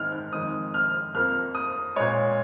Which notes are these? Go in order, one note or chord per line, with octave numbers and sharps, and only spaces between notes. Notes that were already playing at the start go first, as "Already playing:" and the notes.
Already playing: G#2 D#3 G#3 F6
F6
F2 D#3 G#3 D#6
F6
F2 F3 A#3 F6
D#6
A#2 G#3 C#5